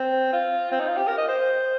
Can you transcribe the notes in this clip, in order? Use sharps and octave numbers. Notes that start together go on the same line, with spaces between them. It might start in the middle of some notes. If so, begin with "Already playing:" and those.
Already playing: C4
F4
C4
D#4
F4
G4
A#4
D#5
C5